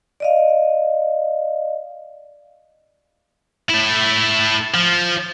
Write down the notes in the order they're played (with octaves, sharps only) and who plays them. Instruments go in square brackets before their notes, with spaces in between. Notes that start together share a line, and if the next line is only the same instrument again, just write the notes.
[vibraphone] D5 D#5 F5
[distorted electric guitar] A3 E4
F3